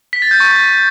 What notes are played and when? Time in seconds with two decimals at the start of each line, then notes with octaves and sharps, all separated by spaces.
0.13 B6
0.22 A6
0.31 G6
0.40 C#6